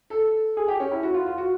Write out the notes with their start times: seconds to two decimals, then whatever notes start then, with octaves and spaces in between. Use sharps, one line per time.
0.10 A4
0.57 G#4
0.68 G4
0.80 C#4
0.92 E4
1.03 F#4
1.14 F4
1.26 F4
1.38 F#4